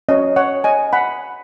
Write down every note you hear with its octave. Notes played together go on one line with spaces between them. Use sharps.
C#4 F#4 C#5 D#5
C#5 F#5
D#5 G#5
F#5 B5